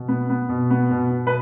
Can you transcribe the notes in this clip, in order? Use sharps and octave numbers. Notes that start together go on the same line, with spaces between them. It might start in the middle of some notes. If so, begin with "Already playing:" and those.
Already playing: B2
B3
B3
B2
B3
B2
B2
B4